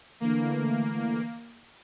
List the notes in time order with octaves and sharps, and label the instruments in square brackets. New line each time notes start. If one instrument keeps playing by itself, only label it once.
[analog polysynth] D3 E3 A3 [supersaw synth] A#3